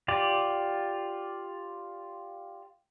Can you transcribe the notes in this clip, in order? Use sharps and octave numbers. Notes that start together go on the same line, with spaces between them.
F4 G4 D5